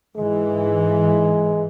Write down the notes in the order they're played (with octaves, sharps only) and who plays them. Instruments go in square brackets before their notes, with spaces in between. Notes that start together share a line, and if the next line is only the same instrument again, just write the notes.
[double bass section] G#2 E3 [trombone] G#3